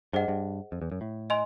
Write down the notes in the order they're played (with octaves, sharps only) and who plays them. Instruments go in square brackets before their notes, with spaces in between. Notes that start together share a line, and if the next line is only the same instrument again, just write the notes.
[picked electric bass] G2 [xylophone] G#4 C5 D#5 F#5
[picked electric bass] G2
F2
E2
F#2
A2
[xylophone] D#5 G#5 C6